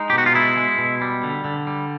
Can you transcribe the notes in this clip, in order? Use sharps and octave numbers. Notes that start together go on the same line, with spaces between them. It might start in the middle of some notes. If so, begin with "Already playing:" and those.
Already playing: G#3 D#4
B2 G4
F#4
F4
G#3 E4
G#3
B2
G3
D3
D3
G3